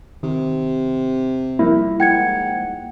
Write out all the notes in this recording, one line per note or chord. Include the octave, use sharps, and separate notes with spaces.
C3 D#3
F3 G3 A#3 E4
G#2 F#5 G5 G#6 C#7